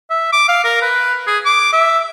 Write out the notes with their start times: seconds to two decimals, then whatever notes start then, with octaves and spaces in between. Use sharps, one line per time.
0.10 E5
0.32 D6
0.48 F5
0.64 A#4
0.82 B4
1.27 G#4
1.45 D6
1.73 E5